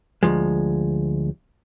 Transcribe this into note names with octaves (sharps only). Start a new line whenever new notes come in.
D2 G2 F3 G#3